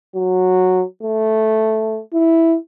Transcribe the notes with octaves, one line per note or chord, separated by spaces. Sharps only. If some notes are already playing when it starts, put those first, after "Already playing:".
F#3
A3
E4